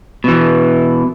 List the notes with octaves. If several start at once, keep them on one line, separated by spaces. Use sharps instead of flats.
B2 E3